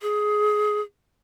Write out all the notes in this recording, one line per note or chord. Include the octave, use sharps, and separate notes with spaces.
G#4